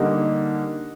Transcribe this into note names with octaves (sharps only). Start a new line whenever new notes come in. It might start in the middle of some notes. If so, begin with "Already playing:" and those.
Already playing: D3 G3 A#3 D#4